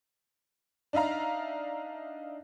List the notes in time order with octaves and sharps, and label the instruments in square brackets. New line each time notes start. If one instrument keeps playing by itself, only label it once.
[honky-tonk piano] D4 D#4 E5 F5 A#5